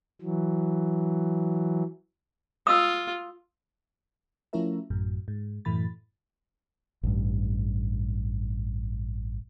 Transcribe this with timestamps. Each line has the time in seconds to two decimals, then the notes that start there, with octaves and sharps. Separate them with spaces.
0.22 E3 F#3
2.67 F4 D#6 E6
4.53 F3 A3 C#4 E4 A#4 E5
4.90 A1 F#2 A2
5.28 G#2
5.65 F#2 A2 E3 B5 A6
7.03 A1 G2